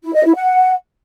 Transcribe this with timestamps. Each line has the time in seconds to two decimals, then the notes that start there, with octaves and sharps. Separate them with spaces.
0.03 E4
0.14 D#5
0.24 E4
0.35 F#5